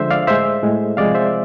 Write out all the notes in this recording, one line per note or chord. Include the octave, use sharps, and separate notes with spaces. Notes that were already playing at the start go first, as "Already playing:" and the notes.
Already playing: D3 F3 G#3 C5 E5
D5 F5
A2 G#3 C5 E5
A2 G#3
C3 F3 G#3 D5 F5
C5 E5